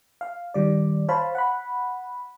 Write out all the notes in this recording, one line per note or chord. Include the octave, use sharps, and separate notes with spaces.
F5
D#3 G3 D5
C5 C#5 F5 A5 B5
F#5 B5